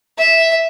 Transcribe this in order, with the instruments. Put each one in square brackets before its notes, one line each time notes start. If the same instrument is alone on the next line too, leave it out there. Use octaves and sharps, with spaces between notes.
[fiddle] E5